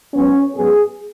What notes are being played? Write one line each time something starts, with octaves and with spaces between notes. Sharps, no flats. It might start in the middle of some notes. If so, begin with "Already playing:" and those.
G#2 F#3 B3 C#4
G#2 F#3 B3 G#4